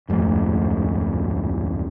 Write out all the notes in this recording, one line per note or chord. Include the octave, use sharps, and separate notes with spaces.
D1 F2 G#2 A3